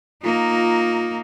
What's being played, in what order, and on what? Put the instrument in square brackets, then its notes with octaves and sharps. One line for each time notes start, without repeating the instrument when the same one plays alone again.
[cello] A#3 D#4 [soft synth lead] F4